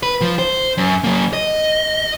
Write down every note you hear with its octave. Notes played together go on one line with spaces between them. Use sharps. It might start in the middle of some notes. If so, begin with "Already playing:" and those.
B4
F3
C5
F#2
F#3 A#3
D#5